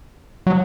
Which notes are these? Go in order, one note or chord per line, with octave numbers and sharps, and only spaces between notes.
F#3